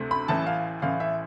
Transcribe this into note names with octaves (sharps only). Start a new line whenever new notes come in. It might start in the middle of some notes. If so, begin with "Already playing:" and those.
Already playing: D2 C3 A3
B5
A1 A2 E3 A5
F5
A1 A2 E3 F5
E5